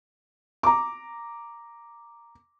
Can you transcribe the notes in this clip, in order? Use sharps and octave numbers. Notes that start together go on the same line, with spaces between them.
A#5 D6